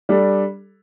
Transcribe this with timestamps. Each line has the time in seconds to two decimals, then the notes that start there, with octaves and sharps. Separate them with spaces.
0.09 G3 D4 A4